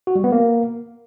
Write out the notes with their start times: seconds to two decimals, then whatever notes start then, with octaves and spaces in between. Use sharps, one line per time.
0.07 F#4
0.16 G3
0.24 B3
0.32 A#3